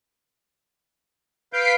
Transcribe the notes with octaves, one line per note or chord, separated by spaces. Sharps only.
B4 F5 G6 B6 C7 D7